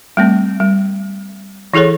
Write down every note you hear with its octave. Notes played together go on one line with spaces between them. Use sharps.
G3 A3 C4
G3
E3 E4 G#4 A4 C#5